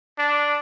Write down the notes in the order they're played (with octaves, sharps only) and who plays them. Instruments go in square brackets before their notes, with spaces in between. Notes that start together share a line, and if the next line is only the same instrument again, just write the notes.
[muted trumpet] D4